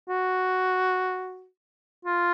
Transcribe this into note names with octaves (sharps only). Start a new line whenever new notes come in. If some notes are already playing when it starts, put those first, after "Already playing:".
F#4
F4